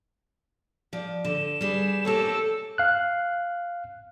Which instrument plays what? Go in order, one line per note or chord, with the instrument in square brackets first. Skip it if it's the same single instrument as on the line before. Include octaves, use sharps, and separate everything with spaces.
[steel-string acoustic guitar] F3 D5
[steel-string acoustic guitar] D3 [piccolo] E7
[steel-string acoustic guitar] G3 G#4 B4
[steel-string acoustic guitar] A#3 G4 C#5 [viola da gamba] A4
[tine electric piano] F5 F#6